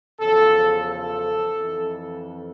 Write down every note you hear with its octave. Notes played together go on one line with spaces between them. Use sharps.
E2 C#3 F3 A4
A4
F2 E3